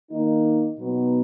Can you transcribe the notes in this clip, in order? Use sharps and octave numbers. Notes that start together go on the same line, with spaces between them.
D#3 A#3 D#4
B2 F#3 B3 D#4